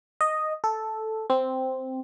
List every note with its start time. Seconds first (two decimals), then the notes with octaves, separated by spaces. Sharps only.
0.21 D#5
0.64 A4
1.30 C4